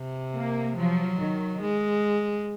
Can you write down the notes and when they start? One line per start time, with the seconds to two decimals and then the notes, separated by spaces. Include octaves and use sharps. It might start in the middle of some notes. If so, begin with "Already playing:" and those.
Already playing: C3
0.35 A#3
0.77 F3 F#3
1.20 D#3
1.61 G#3